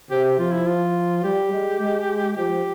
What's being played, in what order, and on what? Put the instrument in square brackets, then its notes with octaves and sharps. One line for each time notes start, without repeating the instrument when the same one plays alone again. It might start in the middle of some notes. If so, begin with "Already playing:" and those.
[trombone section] C3 [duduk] G4
[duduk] G4
[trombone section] F3 [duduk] F4
[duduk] E4
F4
[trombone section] G3 [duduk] G4
[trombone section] G#3
G#3
[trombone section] F3 [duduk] G4